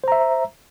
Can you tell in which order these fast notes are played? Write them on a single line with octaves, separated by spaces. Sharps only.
C5 A#5 E5